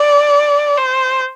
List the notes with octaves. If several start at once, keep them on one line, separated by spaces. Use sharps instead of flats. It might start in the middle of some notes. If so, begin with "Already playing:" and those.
Already playing: D5
C5